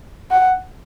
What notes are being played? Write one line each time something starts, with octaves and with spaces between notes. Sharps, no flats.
F#5